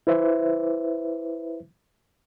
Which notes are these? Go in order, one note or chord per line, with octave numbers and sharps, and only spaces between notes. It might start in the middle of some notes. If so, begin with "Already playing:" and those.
E4 B4 C5 E5